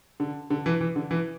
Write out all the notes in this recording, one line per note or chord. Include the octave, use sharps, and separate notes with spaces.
D3
D3
E3
E3
D3
E3